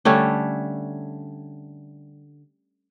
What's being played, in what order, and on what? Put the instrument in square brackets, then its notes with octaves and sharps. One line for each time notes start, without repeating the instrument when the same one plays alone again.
[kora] D3 G3 A3 C#4